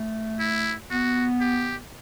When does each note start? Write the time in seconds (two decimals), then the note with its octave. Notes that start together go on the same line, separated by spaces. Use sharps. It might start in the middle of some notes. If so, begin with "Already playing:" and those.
Already playing: A3
0.39 E4
0.90 B3 F#4
1.41 G4